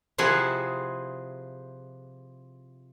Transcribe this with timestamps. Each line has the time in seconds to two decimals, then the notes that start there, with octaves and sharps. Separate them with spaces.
0.18 C3 F3 E4 G#4 F#5